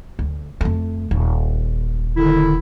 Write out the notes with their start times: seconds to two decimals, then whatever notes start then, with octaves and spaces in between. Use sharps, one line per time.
0.19 D2
0.61 F2 A3
1.11 D#1
2.17 D3 D#3 E4